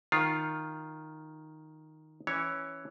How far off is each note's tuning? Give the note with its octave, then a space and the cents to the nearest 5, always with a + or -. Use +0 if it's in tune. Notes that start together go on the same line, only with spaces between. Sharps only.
D#3 +0 F4 +0
E3 +0 C#4 +0 C#5 +0